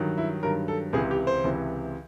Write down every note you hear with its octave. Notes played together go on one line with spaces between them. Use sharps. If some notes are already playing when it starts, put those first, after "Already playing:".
Already playing: G2 D#3 F#3
E4
G2 D#3 F#3 A#4
A4
C#2 C3 E3 G#4
G4
C5
C#2 C3 E3